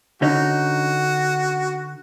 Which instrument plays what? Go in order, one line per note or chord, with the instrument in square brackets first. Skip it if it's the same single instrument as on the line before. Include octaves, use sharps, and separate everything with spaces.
[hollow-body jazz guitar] D3 C#4 D#4 [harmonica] F#4